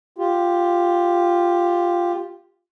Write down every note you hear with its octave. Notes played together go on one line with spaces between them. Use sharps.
F4 G4